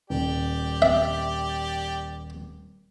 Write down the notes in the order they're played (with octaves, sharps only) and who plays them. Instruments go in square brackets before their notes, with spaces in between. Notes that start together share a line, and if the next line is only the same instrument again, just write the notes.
[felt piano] D#1 [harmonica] G4 D5
[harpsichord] E5